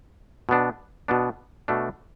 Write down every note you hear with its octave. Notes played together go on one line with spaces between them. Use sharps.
B2 B3 D4
B2 B3 D4
B2 A3 D4